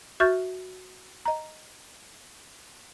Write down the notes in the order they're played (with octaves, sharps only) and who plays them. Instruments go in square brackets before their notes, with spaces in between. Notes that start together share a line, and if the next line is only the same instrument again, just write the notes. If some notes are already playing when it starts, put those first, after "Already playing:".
[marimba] F#4 E5 C#6 F6 G6 A6
D#5 A#5